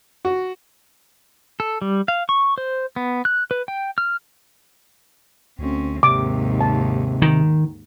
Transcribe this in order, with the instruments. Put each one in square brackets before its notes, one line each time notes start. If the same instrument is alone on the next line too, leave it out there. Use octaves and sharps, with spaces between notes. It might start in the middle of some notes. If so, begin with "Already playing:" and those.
[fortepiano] F#4
[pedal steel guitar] A4
G3
F5
C#6
C5
B3
F#6
B4
G5
F6
[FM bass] D2 [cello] C4 C#4
[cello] D#2 G#2 [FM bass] C3 [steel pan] D6
[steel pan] A5
[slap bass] D#3